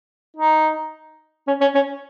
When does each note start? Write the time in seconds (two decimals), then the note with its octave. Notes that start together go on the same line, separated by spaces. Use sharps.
0.37 D#4
1.47 C#4
1.61 C#4
1.75 C#4